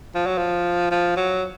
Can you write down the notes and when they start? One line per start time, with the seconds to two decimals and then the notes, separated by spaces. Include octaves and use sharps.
0.15 F3
0.26 F#3
0.38 F3
0.91 F3
1.17 F#3